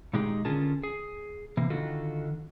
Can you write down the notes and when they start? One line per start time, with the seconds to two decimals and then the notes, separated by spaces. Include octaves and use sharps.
0.13 A#2 D#3 G#3 D#4 G4 G#4
0.45 D3 C#4 F4 G#4 A#4 A5
0.83 G#4
1.57 C3 E3 A#3
1.70 D3 D#3 F4 F#4 A4